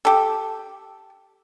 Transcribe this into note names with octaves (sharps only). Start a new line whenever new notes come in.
G4 A4